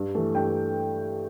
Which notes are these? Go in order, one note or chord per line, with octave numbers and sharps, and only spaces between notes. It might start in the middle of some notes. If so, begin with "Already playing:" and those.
Already playing: G2
E3 A3
G2 G5